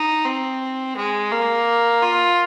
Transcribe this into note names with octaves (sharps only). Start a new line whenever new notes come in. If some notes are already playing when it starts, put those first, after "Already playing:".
Already playing: D#4
C4
G#3
A#3
F4